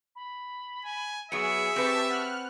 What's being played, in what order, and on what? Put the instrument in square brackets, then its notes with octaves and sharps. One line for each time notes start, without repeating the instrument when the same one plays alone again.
[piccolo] B5
[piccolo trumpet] G#5
[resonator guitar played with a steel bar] F#3 B3 [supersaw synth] G#4 [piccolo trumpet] E5 [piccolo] C#7
[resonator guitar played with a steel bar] C4 B4 [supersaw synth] G4 A5 C#6
[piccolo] F#5 [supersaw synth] F6 F#6